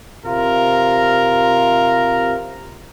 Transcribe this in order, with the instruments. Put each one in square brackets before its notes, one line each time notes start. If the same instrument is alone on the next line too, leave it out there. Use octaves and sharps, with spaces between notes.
[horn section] C3 F4 A#4